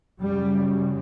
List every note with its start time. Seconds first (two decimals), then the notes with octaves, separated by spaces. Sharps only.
0.21 F#2 C#3 G3